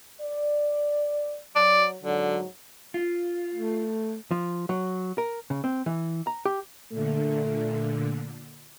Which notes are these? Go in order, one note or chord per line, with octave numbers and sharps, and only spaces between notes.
D5
F#3 D5
G#2 D3 F#3
F4
A3
F3
F#3
A#4
C#3
C4
E3
A#5
G4
A#2 D3 A3